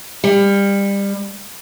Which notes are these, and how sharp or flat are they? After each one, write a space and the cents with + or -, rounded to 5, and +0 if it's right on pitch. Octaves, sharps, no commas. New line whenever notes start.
G3 +25